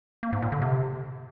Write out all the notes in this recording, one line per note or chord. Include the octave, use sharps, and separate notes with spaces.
A#3
G#2
A#2
D3
C3